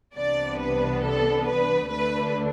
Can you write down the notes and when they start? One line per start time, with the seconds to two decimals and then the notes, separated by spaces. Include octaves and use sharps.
0.15 C2 C3 E3 B3 D4 D5
0.59 B4
1.03 A4
1.47 B4
1.91 D2 D3 A3 D4 B4